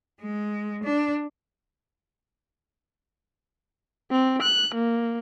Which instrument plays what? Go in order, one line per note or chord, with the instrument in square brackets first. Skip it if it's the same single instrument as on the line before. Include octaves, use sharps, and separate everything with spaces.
[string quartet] G#3
D4
[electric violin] C4
F#6
A#3